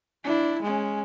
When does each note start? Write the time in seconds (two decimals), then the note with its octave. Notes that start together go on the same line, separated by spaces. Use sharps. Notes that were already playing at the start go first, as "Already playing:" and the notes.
0.24 D4 E4
0.62 G#3 C#4